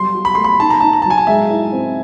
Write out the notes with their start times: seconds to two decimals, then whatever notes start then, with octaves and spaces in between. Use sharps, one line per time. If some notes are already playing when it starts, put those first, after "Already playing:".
Already playing: F#3 G3 C6
0.14 F#4
0.25 B5
0.35 A3 C6
0.44 B5
0.60 D#4 A5
0.70 A#5
0.81 D#4 A5
0.93 A#5
1.02 A5
1.06 F#3 G#5
1.18 A5
1.27 G#3 E5
1.50 E4
1.72 C4